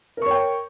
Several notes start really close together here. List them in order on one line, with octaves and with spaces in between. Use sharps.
A#4 C#6 C#5 G5